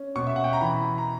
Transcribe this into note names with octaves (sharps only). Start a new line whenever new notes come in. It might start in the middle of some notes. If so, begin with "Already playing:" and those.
Already playing: C#4
B2 C#6
E5
F#5
G5
A#5
E3 B5
A#5